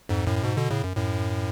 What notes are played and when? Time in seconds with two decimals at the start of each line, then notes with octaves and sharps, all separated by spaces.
0.09 F2 G#2
0.27 F#2 A2
0.44 G#2 B2
0.57 B2 D3
0.70 A2 C#3
0.84 F#2
0.96 F#2 A2